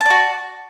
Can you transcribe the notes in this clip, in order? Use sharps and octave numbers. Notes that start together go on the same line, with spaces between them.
F#4 D5 A5